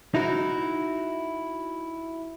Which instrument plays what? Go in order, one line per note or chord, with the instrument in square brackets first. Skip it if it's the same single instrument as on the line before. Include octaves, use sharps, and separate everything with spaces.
[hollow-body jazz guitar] D#4 E4 F#4